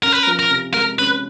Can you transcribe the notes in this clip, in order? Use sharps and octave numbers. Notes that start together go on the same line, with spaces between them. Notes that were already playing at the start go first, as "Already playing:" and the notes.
C#4 A#4
B4
A#4
F3
A#4
C3
G#3 A#4
C#4 B4